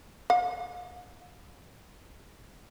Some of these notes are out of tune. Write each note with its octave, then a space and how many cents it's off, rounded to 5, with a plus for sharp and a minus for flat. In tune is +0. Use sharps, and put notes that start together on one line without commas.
F5 +35